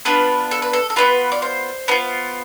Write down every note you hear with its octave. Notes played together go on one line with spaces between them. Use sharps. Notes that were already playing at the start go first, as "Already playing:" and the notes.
B3 D4 F4 B4
A4
B4
A4
A4
B3 D4 F4 B4
D5
C5
B3 D4 F4